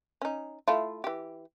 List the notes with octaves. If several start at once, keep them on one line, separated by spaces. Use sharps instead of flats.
C#4 D#4
A3 E4 F4
E3 G4